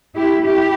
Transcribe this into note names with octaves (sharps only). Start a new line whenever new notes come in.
E4 G4
E4 G4